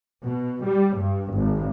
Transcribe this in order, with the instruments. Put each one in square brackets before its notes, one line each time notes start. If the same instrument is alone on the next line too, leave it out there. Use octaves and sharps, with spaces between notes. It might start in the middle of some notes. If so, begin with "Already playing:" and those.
[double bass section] B2
G3
G2
G#1